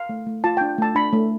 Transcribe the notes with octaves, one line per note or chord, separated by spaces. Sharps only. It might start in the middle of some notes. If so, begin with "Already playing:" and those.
Already playing: F5
A3
A3
F4 A5
D4 G5
A3 A5
D4 B5
A3